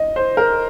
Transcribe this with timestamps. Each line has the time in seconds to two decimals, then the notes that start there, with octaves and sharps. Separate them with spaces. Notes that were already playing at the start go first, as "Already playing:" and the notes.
Already playing: D#5
0.16 C5
0.37 A#4